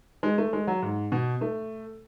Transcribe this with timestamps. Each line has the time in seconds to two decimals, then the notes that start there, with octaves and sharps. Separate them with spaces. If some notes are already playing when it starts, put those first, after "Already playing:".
0.23 G#3
0.38 A3
0.53 G#3
0.67 F#3
0.82 G#2
1.12 B2
1.41 A3